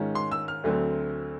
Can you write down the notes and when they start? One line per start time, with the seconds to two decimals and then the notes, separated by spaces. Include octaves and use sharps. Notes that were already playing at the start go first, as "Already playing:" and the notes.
Already playing: G#2 D#3 G#3 C#4 F4
0.15 C6
0.31 E6
0.48 F6
0.64 D2 D3 F#3 A3 C4